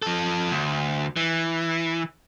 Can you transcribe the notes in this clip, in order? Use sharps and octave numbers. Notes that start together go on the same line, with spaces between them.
F3 A4
D2
E3